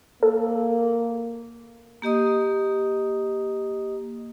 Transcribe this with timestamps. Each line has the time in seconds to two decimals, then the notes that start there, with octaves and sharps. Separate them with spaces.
0.23 A#3 A4
2.02 A#3 G4 D#5 D#6